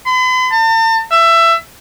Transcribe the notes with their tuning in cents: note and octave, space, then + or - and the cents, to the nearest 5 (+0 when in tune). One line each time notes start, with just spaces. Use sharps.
B5 +45
A5 +40
E5 +20